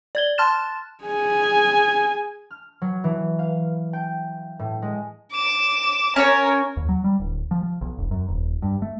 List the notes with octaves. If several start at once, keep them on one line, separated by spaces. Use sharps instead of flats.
D5 G#6 G7
A5 C6 F6 F#6 A6 E7
G#4 G#5
F6
F#3
E3
F5
G5
A2
G#3
D6 E7
C#4 A#4 C#5
D#2
F#3
G3
D1
F3
F3
B1
E1
F#2
D#1
G2
A3